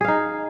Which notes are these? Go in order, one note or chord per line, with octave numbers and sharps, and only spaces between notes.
D#4 G#4 F5